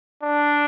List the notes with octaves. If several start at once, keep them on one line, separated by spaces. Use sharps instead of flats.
D4